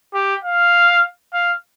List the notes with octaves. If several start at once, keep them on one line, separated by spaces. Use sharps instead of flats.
G4
F5
F5